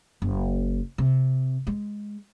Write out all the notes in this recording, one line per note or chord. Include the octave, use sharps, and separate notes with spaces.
F#1
C3
G#3